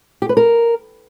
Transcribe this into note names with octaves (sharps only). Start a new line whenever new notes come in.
G4
B4
A#4